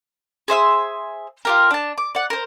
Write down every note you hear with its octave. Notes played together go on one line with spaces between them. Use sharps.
G#4 C5 E5 E6
F4 G4 A#4
D4 A5
D6
D5 F#5
A#4 C5